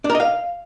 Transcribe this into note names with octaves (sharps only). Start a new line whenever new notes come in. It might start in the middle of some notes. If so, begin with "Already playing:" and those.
D4
A#4
D#5
F5